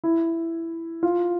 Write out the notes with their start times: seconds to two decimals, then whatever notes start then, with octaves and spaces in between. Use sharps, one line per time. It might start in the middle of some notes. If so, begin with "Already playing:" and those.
0.04 E4
1.03 F4